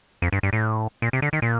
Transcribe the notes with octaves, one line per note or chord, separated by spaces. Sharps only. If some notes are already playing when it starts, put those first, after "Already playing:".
F2
G2
G2
A2
A#2
C3
D3
D#3
A#2